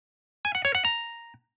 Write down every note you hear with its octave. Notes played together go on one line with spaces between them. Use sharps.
G#5
F#5
C#5
F#5
A#5